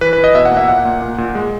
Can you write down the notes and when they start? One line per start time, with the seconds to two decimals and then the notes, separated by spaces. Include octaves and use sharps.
0.01 E3 B4
0.13 B4
0.18 E3
0.24 D#5
0.35 B2 E5
0.45 F#5
0.51 A#3
0.57 E5
0.68 A#2 F#5
0.85 A#2
1.02 A#2
1.18 A#2
1.35 G#3